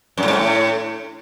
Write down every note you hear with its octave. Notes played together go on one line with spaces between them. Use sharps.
F#2
A2
G#2
A2